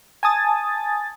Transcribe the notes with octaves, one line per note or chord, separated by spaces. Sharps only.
G#5 A5 D#6 A6